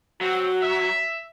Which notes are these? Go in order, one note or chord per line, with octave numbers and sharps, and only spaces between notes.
F#3 C4 F#4
E5